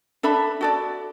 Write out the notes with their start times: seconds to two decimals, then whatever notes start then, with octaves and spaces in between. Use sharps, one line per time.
0.23 D4 A4 E5 B5
0.61 F#4 A4 D5